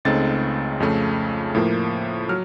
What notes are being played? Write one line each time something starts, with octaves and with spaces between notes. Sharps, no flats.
C#2 C#3 A3 C4 D#4 A6
F2 C#3 A3
A2 F3 A#3
F#3 F6